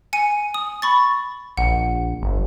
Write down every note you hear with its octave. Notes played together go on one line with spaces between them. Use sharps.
G#5 C#7 D#7
D#6
B5 C#6 A6
A#1 F#5
G1